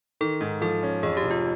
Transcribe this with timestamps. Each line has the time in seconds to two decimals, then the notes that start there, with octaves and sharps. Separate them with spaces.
0.21 D#3 A4
0.40 G#2
0.62 F3 A4
0.83 C#4
1.03 F2 G#4
1.17 G4
1.23 F1
1.31 F4